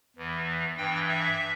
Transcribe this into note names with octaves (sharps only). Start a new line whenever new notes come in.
E2 E3
G2 E3 G5
E5